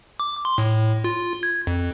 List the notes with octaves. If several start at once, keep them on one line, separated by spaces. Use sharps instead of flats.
D6
C6
A2
F4
G#6
F2